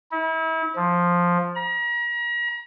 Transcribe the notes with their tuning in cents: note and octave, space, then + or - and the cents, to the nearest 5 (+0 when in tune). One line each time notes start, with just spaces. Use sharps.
E4 -35
F3 +5
A#5 +40